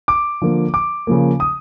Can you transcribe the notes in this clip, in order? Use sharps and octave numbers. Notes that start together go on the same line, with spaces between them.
D6
D3 F3 A#3
D6
C#3 F3 A#3
D#6